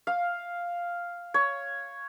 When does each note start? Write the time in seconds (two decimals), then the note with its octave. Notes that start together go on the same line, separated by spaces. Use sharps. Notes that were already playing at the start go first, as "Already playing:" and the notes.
0.07 F5
1.34 C#5